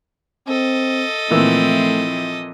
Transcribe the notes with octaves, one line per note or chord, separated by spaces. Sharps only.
C4 A4 D#5
A#2 E3 F3 A3 C4 E4 E6